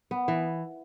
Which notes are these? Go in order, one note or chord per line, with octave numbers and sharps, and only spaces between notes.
B3
E3